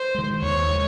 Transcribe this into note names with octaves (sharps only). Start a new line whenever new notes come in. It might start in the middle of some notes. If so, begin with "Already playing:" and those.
Already playing: C5
D#3 G#3
D#2 C#5
D#3 G#3